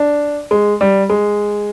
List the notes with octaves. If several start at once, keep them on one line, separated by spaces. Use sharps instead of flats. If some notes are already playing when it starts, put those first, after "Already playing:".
Already playing: D4
G#3
G3
G#3